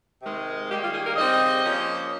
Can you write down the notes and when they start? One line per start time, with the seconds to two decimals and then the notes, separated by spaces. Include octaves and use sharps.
0.22 C3 D#3 G#3
0.69 D#3 G3 A#3 G4
0.81 F4
0.93 G#4
1.04 A#4
1.15 C#3 G3 C4 D#5
1.63 F3 A#3 C#4